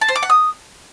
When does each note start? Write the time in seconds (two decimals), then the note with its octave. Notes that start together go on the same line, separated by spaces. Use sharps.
0.01 A5
0.08 C5
0.16 D6
0.23 F#5
0.30 D#6